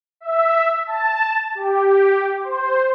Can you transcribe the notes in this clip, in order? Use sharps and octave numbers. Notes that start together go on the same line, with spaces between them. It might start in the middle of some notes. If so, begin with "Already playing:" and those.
E5
A5
G4
C5